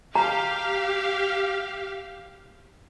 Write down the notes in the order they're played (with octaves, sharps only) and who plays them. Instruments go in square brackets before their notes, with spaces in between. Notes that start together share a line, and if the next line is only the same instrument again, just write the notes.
[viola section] G4 F5 [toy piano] A#5